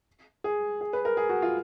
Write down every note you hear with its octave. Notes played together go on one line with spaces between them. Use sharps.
G#4
G#4
B4
A#4
G#4
F#4
F4